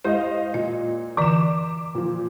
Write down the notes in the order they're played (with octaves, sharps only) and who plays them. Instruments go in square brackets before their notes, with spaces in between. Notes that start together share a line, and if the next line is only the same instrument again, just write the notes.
[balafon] G#3 E4 G4 [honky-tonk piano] C5 D#5 F5
[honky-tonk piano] A#2 [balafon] D#5
[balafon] D3 E3 D5 [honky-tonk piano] D6 E7
[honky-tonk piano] A#2 F3